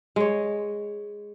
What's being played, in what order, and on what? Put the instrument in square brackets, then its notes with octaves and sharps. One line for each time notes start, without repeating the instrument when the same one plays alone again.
[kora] G#3 C#5